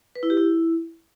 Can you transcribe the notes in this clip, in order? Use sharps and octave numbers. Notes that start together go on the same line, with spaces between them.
B4
E4
G4
E4